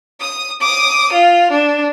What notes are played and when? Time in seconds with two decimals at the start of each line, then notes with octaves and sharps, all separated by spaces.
0.20 D#6
0.61 D6 D#6
1.13 F4
1.52 D4